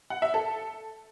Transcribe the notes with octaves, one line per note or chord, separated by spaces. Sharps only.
F#5
E5
A4